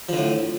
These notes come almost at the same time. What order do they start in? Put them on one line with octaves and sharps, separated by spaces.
F3 D3 A2